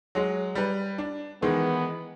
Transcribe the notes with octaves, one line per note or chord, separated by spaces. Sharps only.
F#3 G#3
G3 B4
D4
D#3 E3 G#3 B3